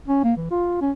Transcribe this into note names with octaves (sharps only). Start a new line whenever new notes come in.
C#4
A#3
E3
F4
C#4